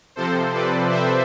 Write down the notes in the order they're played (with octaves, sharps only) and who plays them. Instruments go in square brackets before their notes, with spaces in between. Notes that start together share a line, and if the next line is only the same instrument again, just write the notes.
[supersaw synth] C3 F3 C4 A4 C5
B4 D5
C5 E5